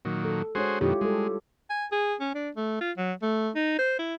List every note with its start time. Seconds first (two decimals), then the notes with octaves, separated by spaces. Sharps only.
0.05 A#2 D#3 F#3
0.24 A4
0.55 G#3 D4 F#4 G#4 C5 C#5
0.81 F#2 B2 D#3 E4 F4 G4
1.01 G3 G#3 A4
1.70 G#5
1.92 G#4
2.20 C#4
2.35 D4
2.56 A3
2.81 F4
2.97 F#3
3.22 A3
3.55 D#4
3.79 C5
3.99 E4